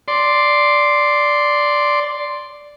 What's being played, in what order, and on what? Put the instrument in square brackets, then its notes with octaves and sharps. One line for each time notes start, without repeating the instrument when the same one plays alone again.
[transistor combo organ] D5 C6